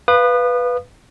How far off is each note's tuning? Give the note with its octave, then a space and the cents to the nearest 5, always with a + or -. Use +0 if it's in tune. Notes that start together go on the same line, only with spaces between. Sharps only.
B4 +0 F5 +0 D#6 -35